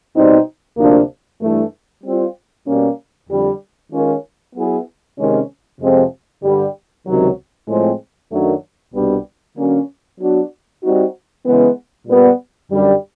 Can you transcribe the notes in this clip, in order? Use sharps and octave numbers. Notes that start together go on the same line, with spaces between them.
B2 G3 C4 D#4
D2 C3 F3 A#3 D4
G2 E3 A3
G3 C4 F4
B2 G3 A#3 C#4
F2 D3 G3
D#3 G#3 C#4 F4 A#4
F#3 B3 E4 G#4
C3 D#3 G#3 C#4
F2 C3 F3 G#3 C4
G2 D3 G3
C#2 C3 D#3 F#3
A2 F3 G#3 C4
F#2 D#3 F#3 A3 D4
C2 B2 G3 B3 D4
D3 F#3 A#3 C#4
F#3 B3 D4 F#4
G3 C4 D#4 F#4
C#3 E3 G#3 B3
A#2 G3 B3
F#2 D3 G3